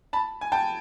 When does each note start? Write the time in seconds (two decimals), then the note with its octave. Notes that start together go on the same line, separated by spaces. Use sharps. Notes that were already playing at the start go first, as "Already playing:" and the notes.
0.13 A5 B5
0.41 G#5
0.52 G5 A5